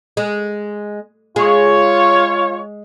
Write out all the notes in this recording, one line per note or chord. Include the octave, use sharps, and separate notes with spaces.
G#3
G#3 F4 G#4 C#5